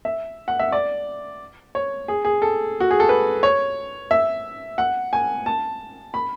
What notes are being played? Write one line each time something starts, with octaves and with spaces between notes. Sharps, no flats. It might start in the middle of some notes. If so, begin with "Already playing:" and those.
E5
F#5
E5
D5
C#5
G#4
G#4
A4
F#4
G#4
A4
B4
C#5
E5
F#5
G#5
A5
B5